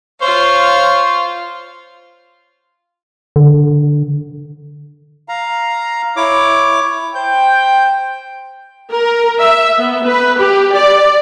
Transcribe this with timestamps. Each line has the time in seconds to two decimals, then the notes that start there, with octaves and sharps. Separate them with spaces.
0.22 F4 C5 C#5 F5
3.36 D3
5.28 F5 A#5
6.16 E4 C#5 D6
7.15 C5 G5 G6
8.92 A#4
9.39 E5
9.78 B3
10.07 B4
10.40 G4
10.75 D5